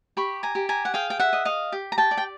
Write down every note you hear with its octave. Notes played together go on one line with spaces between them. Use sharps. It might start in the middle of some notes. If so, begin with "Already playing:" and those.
G4 B5 C#6
G#5 A#5
G4
G#5 A#5
F#5
G#4 F5 G5
G5
E5 F#5
D#5
D#5 F5
G4
A#5
G5 A5
D5
G5